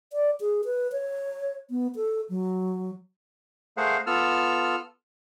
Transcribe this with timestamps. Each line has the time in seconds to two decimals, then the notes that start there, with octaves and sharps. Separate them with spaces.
0.13 D5
0.41 G#4
0.65 B4
0.92 C#5
1.70 B3
1.96 A4
2.30 F#3
3.77 A3 G#4 A#4 C5 F5 F#5
4.07 B3 F4 A4 E6 F6